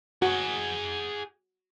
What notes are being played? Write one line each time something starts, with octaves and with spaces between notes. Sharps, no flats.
F#4 G#4 F#5